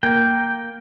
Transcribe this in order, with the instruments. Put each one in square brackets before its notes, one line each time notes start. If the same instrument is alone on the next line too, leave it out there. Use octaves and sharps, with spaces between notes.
[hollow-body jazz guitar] A#3 A#4 [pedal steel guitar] G5